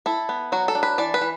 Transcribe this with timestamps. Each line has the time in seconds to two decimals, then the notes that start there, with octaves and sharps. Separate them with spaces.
0.06 E4 A4
0.29 B3
0.52 F#3 F#4
0.68 A4
0.75 D4
0.83 B4
0.98 E3 D5
1.14 B4
1.21 E3